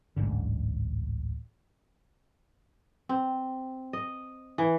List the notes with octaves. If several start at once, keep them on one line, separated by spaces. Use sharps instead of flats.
D1 A1 G#2 D3
C4
D#5
E3